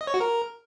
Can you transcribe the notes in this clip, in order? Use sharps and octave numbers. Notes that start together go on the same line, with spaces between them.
D#5
C#5
F#4
A#4